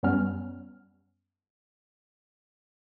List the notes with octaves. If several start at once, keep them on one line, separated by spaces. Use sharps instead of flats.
F#2 G3 B3 C#4 F6